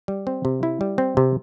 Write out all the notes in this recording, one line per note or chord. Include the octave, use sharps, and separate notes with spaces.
G3
C4
C3
E4
G3
C4
C3